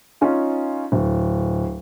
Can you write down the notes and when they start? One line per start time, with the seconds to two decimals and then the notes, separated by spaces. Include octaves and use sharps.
0.21 C#4 D#4 F4
0.92 D1